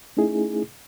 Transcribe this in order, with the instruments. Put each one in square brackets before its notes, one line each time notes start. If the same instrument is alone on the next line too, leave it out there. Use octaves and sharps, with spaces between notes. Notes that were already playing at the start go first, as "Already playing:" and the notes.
[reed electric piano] A3 C#4 D#4 E4 G#4